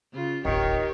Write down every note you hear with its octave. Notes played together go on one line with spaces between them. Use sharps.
C#3 F4
D1 G1 D#3 G4 C#5